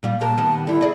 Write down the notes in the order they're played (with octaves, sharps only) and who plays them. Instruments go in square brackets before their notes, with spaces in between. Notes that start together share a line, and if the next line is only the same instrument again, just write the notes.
[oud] A#2 G3 F4
[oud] A#2 G4 A#4 [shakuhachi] A5
[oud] D#3 G3 B3
[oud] D3 G3 [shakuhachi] E4
[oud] G#4 D5 D#5